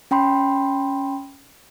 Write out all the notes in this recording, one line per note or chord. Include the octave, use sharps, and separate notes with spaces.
C#4 G5 B5 C6